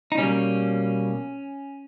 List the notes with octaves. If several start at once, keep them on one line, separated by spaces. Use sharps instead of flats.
D#4
B2 G3 A#3 C#4